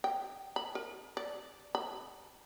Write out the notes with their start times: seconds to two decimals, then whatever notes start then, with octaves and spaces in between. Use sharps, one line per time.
0.04 G5
0.56 B5
0.75 A#4
1.17 D5
1.75 B5